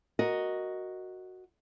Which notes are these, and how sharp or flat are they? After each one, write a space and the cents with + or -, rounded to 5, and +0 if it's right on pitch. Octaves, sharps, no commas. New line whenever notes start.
F#4 +0 A#4 +0 D#5 +0